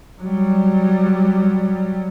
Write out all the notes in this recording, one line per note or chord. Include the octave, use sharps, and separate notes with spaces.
F#3 G3